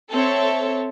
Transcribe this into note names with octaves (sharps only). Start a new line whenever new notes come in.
C4 A4 C#5 E5